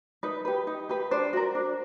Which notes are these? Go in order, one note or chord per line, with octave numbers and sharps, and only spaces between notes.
D#4 B4
G4 B4
D#4
G4 B4
D4 C5
F#4 A#4
D4